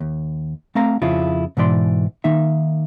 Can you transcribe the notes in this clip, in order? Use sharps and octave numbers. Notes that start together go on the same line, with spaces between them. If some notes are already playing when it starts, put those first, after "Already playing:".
D#2
A3 C4 F5 A#5
F2 C#3 E4 F4
G#2 B2 E3 D5 C6
D#3 A#3 D#4 E5